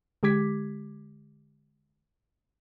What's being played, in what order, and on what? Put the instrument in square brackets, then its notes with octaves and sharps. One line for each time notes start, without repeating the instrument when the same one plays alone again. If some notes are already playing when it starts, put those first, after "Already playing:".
[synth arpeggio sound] D3 G#3 G4 D6 G#6 B6